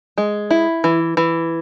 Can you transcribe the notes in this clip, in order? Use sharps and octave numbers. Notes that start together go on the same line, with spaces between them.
G#3
E4
E3
E3